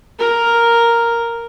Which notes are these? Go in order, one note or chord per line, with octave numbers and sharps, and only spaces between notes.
A#4